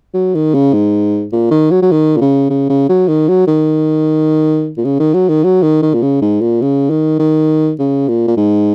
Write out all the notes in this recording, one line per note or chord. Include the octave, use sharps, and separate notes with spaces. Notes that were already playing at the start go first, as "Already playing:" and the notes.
F#3
D#3
C#3
G#2
A#2
D#3
F#3
F#3
D#3
A#2
C#3
C#3
C#3
F#3
D#3
F#3
D#3
A#2
C#3
D#3
F#3
D#3
F#3
D#3
D#3
A#2
C#3
G#2
A#2
C#3
D#3
D#3
C#3
A#2
A#2
G#2